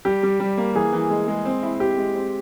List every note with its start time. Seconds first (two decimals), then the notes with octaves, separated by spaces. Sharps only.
0.05 G3 G4
0.23 G3
0.40 G3
0.57 A#3
0.75 E3 G#4
0.93 E3
1.10 G#3
1.28 G#3
1.45 C4
1.62 E4
1.80 C4 G4
1.98 G#3
2.15 C4